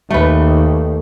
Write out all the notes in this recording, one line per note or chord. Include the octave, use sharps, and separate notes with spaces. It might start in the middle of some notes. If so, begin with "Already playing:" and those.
D#2 A3 B4